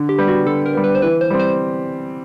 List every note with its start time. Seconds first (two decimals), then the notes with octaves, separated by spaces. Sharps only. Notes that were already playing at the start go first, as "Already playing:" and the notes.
Already playing: D3
0.09 G4
0.18 G3 B3
0.28 F#4
0.46 D3 A4
0.66 A#4
0.74 G3 B3
0.84 B4
0.95 C5
1.02 E3 B4
1.21 C5
1.30 G3 C4
1.39 C5